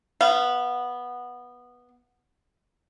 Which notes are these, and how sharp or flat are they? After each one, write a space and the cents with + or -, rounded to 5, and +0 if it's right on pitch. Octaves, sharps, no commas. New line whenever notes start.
B3 -10 F5 -40